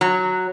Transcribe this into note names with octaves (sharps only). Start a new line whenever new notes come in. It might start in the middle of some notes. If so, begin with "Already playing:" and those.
F#3